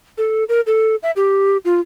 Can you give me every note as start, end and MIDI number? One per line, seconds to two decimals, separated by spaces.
0.18 0.44 69
0.49 0.61 70
0.67 0.96 69
1.03 1.11 76
1.16 1.57 67
1.65 1.80 65